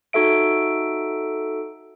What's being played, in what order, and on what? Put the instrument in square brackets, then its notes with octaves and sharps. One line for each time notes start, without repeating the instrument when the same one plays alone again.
[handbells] D#4 F#4 A4 E5 D7